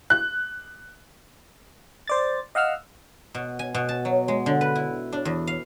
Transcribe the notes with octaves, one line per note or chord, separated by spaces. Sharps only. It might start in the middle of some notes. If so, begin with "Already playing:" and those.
F#6
C5 D5 A6
D#5 F5 F#5 E6 F6
B2
G#5
B2
A5
F#3
G#3
D3
B4
E4
D4
E2
F5